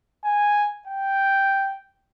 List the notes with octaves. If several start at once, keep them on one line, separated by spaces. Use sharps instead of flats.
G#5
G5